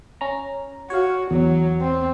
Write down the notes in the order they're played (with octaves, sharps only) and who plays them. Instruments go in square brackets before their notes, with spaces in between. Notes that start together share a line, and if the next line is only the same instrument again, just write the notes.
[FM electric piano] C#4 A#5
[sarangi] F#4 [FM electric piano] C#5 F5
[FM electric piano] E2 [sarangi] F#3
[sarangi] C4